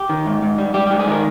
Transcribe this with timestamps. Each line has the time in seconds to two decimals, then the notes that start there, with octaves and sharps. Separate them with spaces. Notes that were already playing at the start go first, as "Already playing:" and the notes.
Already playing: G4
0.09 D#3
0.26 G#2
0.42 G#2
0.58 G3
0.74 G3 G4
0.87 G#2 G4
0.99 G#4
1.07 D#3 A#4